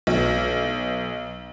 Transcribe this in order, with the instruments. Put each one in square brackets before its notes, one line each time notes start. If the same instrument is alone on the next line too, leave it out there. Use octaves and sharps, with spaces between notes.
[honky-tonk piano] B1